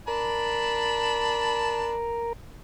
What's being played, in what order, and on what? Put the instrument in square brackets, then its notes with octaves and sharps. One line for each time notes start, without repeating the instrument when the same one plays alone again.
[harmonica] D4 A5 B5 [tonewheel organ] A#4